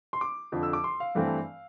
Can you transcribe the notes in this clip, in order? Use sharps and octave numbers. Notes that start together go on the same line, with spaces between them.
C6
D6
F2 D3 F3
E6
D6
C6
F5
G2 E3 A3 C4